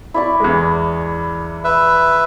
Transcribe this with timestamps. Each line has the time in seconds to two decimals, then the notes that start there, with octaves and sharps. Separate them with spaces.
0.14 E4 D5 C#6
0.40 E2 G#3
1.64 B4 E5